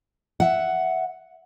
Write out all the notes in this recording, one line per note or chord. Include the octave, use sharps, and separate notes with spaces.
E5 F#5